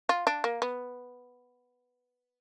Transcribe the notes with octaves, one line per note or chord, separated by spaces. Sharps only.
F4
D4
A#3
B3